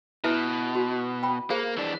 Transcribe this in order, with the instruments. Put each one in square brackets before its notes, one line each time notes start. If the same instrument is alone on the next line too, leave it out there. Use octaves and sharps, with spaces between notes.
[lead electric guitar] B2 [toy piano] E4 B4 E5
[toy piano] F#4
G5 B5
[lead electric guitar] A#3 [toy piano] G#4 C5 F5
[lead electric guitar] E3 D4